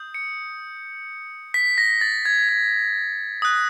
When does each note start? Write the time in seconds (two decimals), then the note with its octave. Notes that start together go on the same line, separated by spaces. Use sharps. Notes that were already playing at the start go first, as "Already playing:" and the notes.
Already playing: D#6 G6
0.14 C#7
1.54 B6
1.78 A#6
2.01 A6
2.25 G#6
2.49 G#6
3.42 D#6 F#6